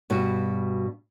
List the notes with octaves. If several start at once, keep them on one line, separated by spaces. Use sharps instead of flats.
G2 B2 G3 F#4